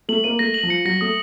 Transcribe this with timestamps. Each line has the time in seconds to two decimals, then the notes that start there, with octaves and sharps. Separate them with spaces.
0.09 A3 F#7
0.24 A#3 D#7
0.39 A3 A#6
0.54 F#7
0.63 F3
0.70 C#7
0.85 F#3 A#6
1.01 A3 D#6